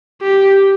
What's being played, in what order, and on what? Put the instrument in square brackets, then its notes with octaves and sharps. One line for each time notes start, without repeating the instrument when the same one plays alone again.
[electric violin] G4